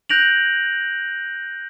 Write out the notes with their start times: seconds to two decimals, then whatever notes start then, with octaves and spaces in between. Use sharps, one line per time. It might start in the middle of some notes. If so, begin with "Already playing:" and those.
0.09 F#6 G6 A#6 D7 F7 F#7